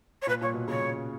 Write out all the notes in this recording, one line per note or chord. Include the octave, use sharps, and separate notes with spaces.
C#5
A#2 B4
A#2 C#5
B2
C#3 C#5